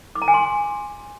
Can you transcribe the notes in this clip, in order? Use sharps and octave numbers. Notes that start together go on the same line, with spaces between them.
D6
A#5
G#5
C6